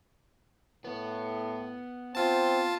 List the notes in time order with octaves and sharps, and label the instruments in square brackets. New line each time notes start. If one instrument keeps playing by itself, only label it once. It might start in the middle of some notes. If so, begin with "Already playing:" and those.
[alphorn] A2 [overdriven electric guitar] B3
[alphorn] C4 [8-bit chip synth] F4 A5